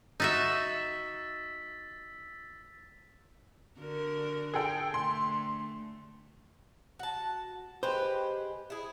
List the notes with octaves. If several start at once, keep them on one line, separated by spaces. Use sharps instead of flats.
D#4 F#4 E5 E6 A6 B6
D3 F#4 A#4
G#4 A4 G5
D3 A3 C6
F#4 A5
G#3 G4 B4 C5
E4 G#4